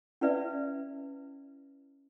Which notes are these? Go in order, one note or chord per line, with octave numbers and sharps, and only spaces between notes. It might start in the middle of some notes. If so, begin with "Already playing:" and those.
C#4 E4 B4 D5 E5